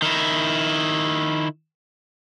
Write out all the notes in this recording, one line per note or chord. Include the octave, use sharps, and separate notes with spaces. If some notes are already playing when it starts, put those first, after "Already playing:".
D#3 E4